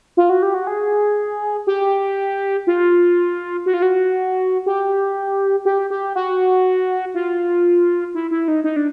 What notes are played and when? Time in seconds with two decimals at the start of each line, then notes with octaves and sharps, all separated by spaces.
0.17 F4
0.30 F#4
0.43 G4
0.54 F#4
0.67 G#4
1.67 G4
2.67 F4
3.66 F#4
3.74 F4
3.82 F#4
4.66 G4
5.65 G4
5.90 G4
6.15 F#4
7.14 F4
8.14 E4
8.31 E4
8.48 D#4
8.64 D#4
8.76 D4